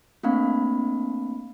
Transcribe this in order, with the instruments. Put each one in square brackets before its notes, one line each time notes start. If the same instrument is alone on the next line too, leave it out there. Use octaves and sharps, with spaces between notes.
[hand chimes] A3 A#3 C4 D4 F5 B5